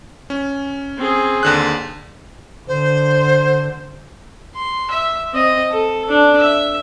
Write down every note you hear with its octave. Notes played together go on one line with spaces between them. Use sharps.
C#4
C4 G#4
D#2 D3 F#6
D3 C5
C6
E5
C4 D#5
A4
D4
E5